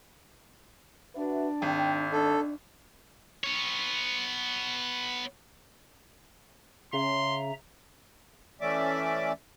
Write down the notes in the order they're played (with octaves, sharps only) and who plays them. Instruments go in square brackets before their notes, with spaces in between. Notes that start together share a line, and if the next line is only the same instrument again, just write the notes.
[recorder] D4 [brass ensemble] F#4 B4 E5
[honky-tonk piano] G#1 [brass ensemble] G5
[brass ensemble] D4 [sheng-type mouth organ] A4
[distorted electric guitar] B3 C#5
[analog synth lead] C#3 [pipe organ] E5 A#5 [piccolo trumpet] C6
[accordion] E3 A3 C#4 D5 E5 D6